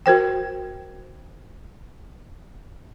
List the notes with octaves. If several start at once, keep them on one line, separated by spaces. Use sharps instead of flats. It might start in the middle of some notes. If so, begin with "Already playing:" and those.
F#4 A#4 C5 G5